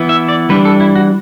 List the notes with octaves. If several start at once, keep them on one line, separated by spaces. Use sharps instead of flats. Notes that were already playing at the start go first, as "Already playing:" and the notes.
Already playing: E3 B3 E4
E5
D5
E3 G3 D4 B4
A4
E4
F#4